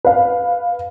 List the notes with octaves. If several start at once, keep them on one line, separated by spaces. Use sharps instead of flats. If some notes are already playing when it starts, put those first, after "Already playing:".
B4 F5